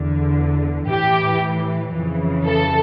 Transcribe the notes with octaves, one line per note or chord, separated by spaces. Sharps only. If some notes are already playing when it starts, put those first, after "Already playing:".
Already playing: E2 D3
A2 E3 G4
F2 C#3 E3
A4